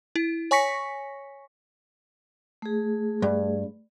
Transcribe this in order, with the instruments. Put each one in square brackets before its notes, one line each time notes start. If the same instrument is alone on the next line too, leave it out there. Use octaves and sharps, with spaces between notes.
[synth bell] E4
C#5 G#5 C#6 A#6 B6 C#7
[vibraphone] A3 G#4
[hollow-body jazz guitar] G2